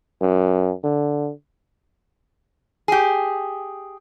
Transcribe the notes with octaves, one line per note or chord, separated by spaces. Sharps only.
F#2
D3
G4 G#4